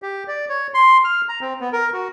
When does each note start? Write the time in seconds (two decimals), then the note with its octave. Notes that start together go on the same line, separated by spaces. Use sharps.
0.02 G4
0.28 D5
0.49 C#5
0.74 C6
1.04 F6
1.29 A#5
1.41 C4
1.61 B3
1.73 A#4
1.93 F#4